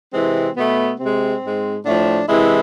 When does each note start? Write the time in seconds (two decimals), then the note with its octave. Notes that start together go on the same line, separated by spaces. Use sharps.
0.13 C3 E3 G#3 C4
0.56 B2 A3 B3
0.99 C3 G#3 C4
1.43 G#2 G#3
1.85 A2 F3 A3 D4
2.28 C3 E3 G#3 E4